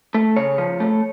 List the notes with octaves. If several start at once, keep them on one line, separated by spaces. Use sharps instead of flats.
A3
C#3 C#5
F3
A3